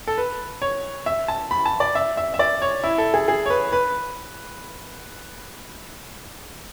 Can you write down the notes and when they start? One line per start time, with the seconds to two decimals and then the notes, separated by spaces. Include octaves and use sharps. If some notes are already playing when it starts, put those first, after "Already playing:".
0.07 A4
0.18 B4
0.62 C#5
1.06 E5
1.28 A5
1.51 B5
1.66 A5
1.80 D5
1.95 E5
2.17 E5
2.34 E5
2.39 D5
2.62 C#5
2.84 E4
2.98 A4
3.14 G#4
3.28 G#4
3.46 C#5
3.50 B4
3.72 B4